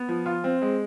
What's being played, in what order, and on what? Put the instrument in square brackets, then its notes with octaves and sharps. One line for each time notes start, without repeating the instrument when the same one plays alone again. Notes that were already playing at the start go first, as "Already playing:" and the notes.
Already playing: [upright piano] B3
F3
F4
C4
G#3